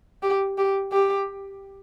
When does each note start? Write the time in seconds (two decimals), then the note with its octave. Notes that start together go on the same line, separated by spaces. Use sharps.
0.23 G4
0.58 G4
0.93 G4